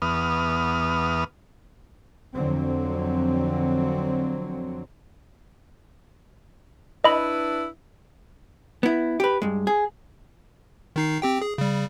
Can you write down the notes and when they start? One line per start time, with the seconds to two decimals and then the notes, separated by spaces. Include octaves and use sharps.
0.02 E2 B3 D#6 F6
2.34 F2 D3 F#3 C4
7.04 D4 E4 B4 D#5 B5
8.83 B3 E4
9.20 G4 B4
9.42 G2 G#3
9.67 G#4
10.96 D#3 D#4 C7
11.22 C4 G4 G5
11.42 G#4
11.58 C#3 G3